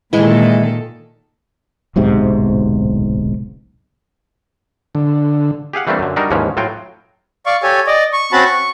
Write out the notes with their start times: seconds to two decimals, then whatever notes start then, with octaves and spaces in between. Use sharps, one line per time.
0.13 A#2 D#3 E3 G#3 E4 A4
1.96 D1 B1 G#2 C3
4.95 D3
5.73 G4 G#4 F5 F#5
5.87 E3 G3 A3 A#3 C4 D4
5.99 F#2 D3
6.16 G3 D4 D#4 F#4 A#4
6.30 D#2 G#2 E3 F3 C#4
6.57 A2 F#3 F4 F#4 G5
7.46 D5 F5 C#6
7.63 G4 A4 C#5 G#5
7.87 D5 D#5
8.13 C#6
8.32 C4 C#4 F#4 A5 B5
8.45 C#6